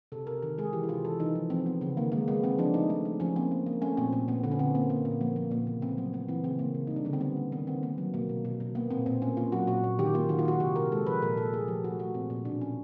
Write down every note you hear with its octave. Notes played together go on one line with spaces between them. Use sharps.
C3 A4
C3 A#4
D#3 A#4
G#3 G#4
E3 G4
E4
C3 F4
E3 A4
E3 D#4
F3
F3 C4
F3 B3
C#3 B3
D#3 A#3
G#3 A#3
G#3 B3
G#3 C4
F3 D4
A3 D#4
A3
A3
F3 C#4
A#3 C4
A#3
A#3
A3 C#4
A#2 C4
A#2 C4
A#2 B3
D3 B3
C#4
D3 C4
A#3 C4
A#3 B3
A#2 B3
F3 A#3
F3 B3
A#2 A#3
C#3 B3
A3 C4
F#3 B3
A3 B3
E3 C4
C#3 C4
C#3 A#3
C#3
G3 D#4
D4
D3 C#4
C4
G3 B3
A#3
D#3 B3
D#3 C4
A#3 B3
F#3
B2 A#3
B2
B2
B2
A#3 B3
A#2 C4
A#2 C4
A#3 C#4
A#3 F4
F#3 F#4
A#2 F#4
A#2
D#3 G4
A#3 F4
D#3 F#4
F4
D#3 F#4
C3 G4
C3 A#4
G#3 A4
F3 B4
A#2 A#4
A#2 A4
A3 G#4
F3 G4
A3 F#4
A3 F#4
A#2 C4
A#2
B2 D4
B2 C#4